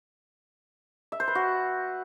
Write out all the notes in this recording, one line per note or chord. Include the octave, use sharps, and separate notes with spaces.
E5
C5
B4
F#4